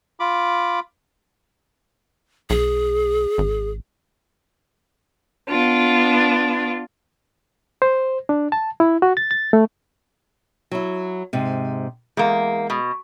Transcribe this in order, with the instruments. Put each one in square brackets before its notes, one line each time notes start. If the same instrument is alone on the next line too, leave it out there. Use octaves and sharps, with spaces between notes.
[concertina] F4 B5 D6
[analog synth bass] B1 [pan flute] G#4
[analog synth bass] G#1
[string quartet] B3 D4 F4
[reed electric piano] C5
D4
A5
E4
F#4
A6
A6
A3
[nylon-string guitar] F#3 E4
G#2 C3
[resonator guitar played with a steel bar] E2 A#3 [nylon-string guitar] G#3
[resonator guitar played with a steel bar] B2